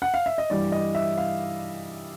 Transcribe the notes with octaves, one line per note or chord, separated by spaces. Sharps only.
F#5
F5
E5
D#5
G2 E3 G3 D5
D#5
E5
F5